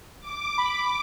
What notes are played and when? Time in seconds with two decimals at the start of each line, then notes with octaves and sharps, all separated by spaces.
0.21 D6
0.58 B5